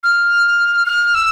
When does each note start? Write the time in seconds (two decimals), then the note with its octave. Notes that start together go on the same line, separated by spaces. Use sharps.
0.03 F6
0.86 F6
1.14 E6